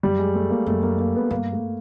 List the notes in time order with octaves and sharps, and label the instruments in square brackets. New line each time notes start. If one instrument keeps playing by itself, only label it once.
[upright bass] F#2 [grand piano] G3
[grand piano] G#3
A3
A#3
[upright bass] F#2 [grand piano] A3
[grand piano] A#3
A#3
B3
[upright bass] G2 [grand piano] A#3
[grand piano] A3